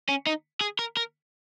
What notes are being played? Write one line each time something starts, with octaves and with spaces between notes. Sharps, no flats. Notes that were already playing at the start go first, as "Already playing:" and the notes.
C#4
D#4
G#4
A#4
A#4